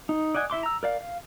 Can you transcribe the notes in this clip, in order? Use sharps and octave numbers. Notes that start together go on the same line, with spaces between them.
D#4
D5 D#5 F#5 G#5
E4 E5 C6 D6
A#5 E6
A#4 D5 F5
F5